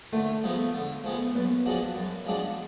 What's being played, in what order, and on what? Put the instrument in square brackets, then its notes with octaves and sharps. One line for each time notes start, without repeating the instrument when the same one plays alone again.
[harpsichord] D3 [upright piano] A3
[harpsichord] F3 G#3 B3
D3
F3 G#3 B3
[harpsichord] F#2 [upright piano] B3
[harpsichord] F3 G#3 D4 F#4
F#2
F3 G#3 D4 F#4